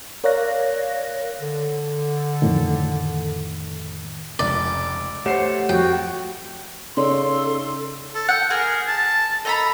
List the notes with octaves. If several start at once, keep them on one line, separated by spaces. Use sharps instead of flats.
A#4 C#5 D5 F5 F#6 A#6
D3
F2 A2 D#3
F1 C#2 D5
A3 G4 C5 C#5 F#5 C7 E7
F2 F#4 G5
C#3 D#4 A4 C#5 D5 C6
A4
F#5 G5
G#4 A#4
A5
A4 D#5 A#5 B5